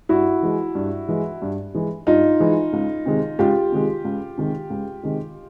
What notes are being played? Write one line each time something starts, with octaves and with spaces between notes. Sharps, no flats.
G2 E4 F#4
E3 G#3
G2
E3 G#3
G2
E3 G#3
G2 D#4 F4
E3 G#3
C#2
C3 D#3 G#3
C#2 F4 G4
C3 D#3 G#3
C#2
C3 D#3 G#3
C#2
C3 D#3 G#3